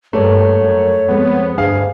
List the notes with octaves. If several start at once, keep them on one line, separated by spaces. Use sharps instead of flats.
G2 A3 A#3 C#5 D5
F#2 A#4
F2 G#3 B3 C4
D2 G2 G#4 F5